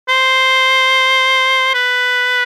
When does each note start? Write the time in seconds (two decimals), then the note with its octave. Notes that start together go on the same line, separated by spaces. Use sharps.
0.09 C5
1.74 B4